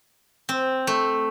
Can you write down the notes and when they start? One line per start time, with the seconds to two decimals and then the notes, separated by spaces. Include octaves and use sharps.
0.49 C4
0.87 A3